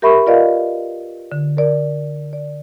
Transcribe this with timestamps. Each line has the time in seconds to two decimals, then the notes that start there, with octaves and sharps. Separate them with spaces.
0.02 G4 A#4 E5 B5 C#6
0.27 F4 A#4 B4 D5 D#5 F5
1.32 D3
1.57 A#4 D5
2.33 D5